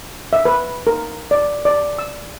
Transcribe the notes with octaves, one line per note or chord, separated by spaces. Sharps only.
E5
B4
A#4
D5
D5
E6